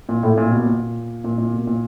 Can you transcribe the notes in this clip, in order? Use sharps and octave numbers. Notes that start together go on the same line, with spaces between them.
A#2
A2
A#2
B2
A#2
A#2
A#2
B2
A#2